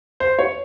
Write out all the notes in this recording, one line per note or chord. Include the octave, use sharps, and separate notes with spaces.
C5
C#5